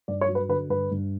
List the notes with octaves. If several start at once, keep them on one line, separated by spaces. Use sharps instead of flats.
G2 D5
C#5
F#3
B4
D3 B4
G2 B4
G2